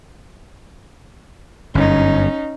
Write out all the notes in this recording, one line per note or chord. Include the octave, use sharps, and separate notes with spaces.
G1 F#2 C#4 D#4